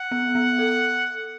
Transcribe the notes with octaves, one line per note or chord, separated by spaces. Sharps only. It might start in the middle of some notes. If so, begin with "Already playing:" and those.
Already playing: F#5
B3
B3
A4